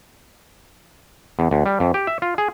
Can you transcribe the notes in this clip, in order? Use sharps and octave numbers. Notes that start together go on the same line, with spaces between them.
E2
D2
G3
F2
G4
E5
F4
G#4